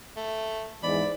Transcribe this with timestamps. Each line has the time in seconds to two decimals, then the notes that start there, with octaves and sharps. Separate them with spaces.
0.16 A3
0.83 E2 G#2 E3 D5 B5